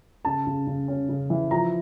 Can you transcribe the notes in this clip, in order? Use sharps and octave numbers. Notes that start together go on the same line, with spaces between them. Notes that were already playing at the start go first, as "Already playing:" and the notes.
C#3 A5
C#3
C#3
C#4
C#3
E3
F3 A#5